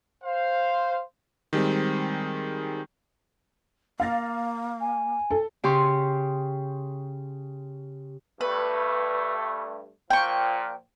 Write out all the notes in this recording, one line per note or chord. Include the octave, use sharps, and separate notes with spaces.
C5 F5
D#3 G3 G#3 C4
A#3 F5 A6 A#6
G#5
A4
C#3 G4 C6 C#6
G2 A3 B4
A#2 F3 G5 C#6